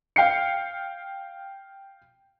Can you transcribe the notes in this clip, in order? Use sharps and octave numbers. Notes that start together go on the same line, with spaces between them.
F5 G5 C7 C#7